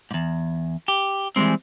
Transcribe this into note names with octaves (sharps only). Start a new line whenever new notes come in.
E2 G#2
G4
E3 F3 G3 G#3 C4